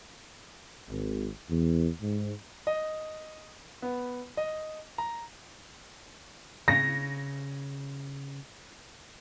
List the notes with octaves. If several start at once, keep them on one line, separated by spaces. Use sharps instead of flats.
G#1
E2
G#2
D#5
B3
D#5
A#5
C#3 A#6